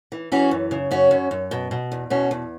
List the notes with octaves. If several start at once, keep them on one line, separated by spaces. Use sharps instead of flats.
E3
E3 C#4 F#4
F#2
C#3
F#2 C#4 F#4
F#2
F#2
B2
B2
E2
B2 C#4 F#4
E2